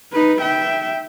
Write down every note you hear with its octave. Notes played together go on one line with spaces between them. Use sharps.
D#4 B4
E5 G5